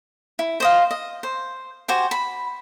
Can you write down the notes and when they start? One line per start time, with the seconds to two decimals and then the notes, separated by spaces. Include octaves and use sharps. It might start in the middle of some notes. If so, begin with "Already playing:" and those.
0.39 E4
0.60 C5 D#5 F5
0.91 D#5
1.23 C5
1.88 F#4 G4 C5 G#5
2.11 B5